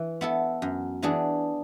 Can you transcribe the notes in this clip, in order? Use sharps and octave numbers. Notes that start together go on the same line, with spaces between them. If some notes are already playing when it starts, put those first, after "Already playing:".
Already playing: E3
B3 E4 A4
F#2
E3 B3 D4 G#4